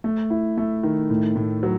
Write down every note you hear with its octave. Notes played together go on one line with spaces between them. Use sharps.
A3
E4
A3
D#3
A2
A2
F#3